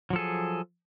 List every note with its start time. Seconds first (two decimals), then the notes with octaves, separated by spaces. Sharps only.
0.10 F#3
0.13 F3
0.16 A4
0.18 G#4